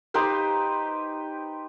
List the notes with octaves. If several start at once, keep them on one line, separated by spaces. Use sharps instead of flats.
D#4 G4 B4 C5